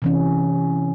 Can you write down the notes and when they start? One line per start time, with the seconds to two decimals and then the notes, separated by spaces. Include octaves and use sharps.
0.02 C3 E3 C#4